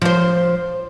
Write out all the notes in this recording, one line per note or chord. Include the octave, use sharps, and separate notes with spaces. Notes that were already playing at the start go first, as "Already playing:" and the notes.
F3 C5